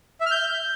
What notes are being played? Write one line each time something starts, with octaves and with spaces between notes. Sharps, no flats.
E5
F6
G6